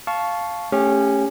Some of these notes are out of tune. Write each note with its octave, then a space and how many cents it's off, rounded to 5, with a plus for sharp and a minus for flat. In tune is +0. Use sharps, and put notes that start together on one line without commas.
F5 +0 A5 -15 C#6 +0
A3 +0 C#4 +0 G4 +30